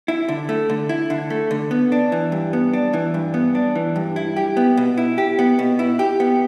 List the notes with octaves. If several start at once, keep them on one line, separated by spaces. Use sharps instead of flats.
E4
D3
A3
D3
E4
D3
A3
D3
B3
D4
E3
G2
B3
D4
E3
G2
B3
D4
E3
G2
E4
G4
B3
B2
E4
G4
B3
B2
E4
G4
B3